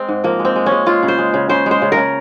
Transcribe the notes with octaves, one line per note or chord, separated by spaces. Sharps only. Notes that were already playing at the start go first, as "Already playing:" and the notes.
Already playing: G#3 C4
G#2
F3 A#3
G#3
C4
G#3
G#3 C#4
G#3 F4
C#3
C5
G#3
C#3
C#3 C5
G#3 C5
C#3
C#3 A#4